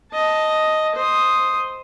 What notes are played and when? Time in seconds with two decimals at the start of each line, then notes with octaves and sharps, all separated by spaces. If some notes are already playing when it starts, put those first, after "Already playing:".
0.13 D#5 A5
0.95 C5 D#6